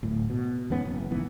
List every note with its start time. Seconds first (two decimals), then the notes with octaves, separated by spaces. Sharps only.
0.03 D1 A2
0.30 B2
0.70 E2 G#2 B3 C#4
0.85 F#1
1.11 F1 G#2 E3 B3